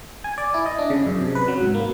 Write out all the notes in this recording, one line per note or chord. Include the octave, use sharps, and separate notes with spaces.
G#5
D5
E4
D#5
D4
C#3
F#2
C3
B4
F#3
G#2
A#3